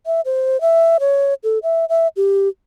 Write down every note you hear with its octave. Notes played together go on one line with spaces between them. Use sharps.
E5
C5
E5
C#5
A4
E5
E5
G4